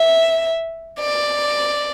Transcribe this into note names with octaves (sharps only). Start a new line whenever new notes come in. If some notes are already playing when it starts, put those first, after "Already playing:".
Already playing: E5
D5